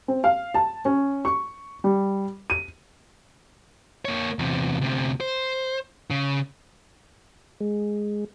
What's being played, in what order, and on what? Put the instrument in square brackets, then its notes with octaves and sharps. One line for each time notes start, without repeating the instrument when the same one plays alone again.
[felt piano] C4
F5
A5
C#4
C#6
G3
D#7
[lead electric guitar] A#3 C#5
E2 C3
D2 C3
C5
C#3
[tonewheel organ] G#3